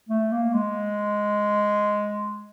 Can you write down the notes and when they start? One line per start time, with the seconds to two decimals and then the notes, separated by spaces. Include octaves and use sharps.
0.09 A3
0.32 A#3
0.54 G#3